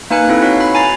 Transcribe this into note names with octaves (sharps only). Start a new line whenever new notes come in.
A#3 D#4 B4 G#5 F#6 C#7
C4 E4 A4
D#4 E4 F#4 C#5 F5
B5
G#5 A#5 A6 C7